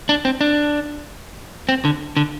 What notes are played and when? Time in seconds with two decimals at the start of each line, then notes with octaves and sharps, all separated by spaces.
0.09 D4
0.25 C4
0.41 D4
1.69 C4
1.85 D3
2.17 D3